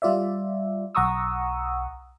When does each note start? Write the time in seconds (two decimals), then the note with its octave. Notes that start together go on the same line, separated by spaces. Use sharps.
0.02 G3 F4 D5 E5
0.95 B1 F#5 A#5 C#6 D#6 E6